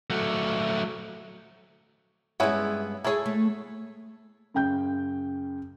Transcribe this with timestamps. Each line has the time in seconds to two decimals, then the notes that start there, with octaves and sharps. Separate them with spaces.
0.10 F#3 A3
2.40 G2 G#3 B3 C#4 E4
3.04 E4 F4 G#4 A4 C#5
3.26 A3
4.54 F#2 C#3 G5 G6